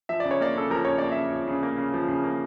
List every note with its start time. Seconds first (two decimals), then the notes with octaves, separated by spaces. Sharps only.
0.09 F3 E5
0.20 C#3 D5
0.31 C#5
0.40 A#3 D5
0.56 C#3 A4
0.70 F3 A#4
0.85 C#3 C#5
0.98 A#3 D5
1.12 C#3 E5
1.32 F3
1.48 C#3
1.63 A#3
1.78 C#3
1.94 F3
2.08 C#3
2.24 A#3